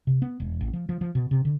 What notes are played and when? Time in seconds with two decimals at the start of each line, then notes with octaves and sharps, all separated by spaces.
0.07 C3
0.22 B3
0.40 E1
0.61 A1
0.73 F3
0.89 F3
1.01 F3
1.15 B2
1.31 C3
1.45 D3